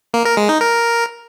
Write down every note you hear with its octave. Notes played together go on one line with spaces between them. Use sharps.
A#3
A#4
G#3
D#4
A#4